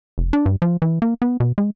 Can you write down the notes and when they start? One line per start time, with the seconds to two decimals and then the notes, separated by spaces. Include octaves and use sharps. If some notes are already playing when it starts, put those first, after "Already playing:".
0.18 F1
0.33 D4
0.46 G2
0.62 F3
0.82 E3
1.02 A#3
1.22 B3
1.40 B2
1.58 G#3